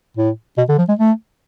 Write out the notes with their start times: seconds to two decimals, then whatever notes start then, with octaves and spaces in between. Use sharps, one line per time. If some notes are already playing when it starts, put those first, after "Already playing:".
0.17 A2
0.57 B2
0.69 D3
0.78 F3
0.88 G#3
0.99 A3